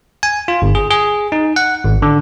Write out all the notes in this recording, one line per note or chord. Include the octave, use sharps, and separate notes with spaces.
G#5
F4
G1
G#4
G#4
D#4
F#5
G#1
D3